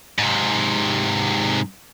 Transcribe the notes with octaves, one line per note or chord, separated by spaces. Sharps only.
G#2 C3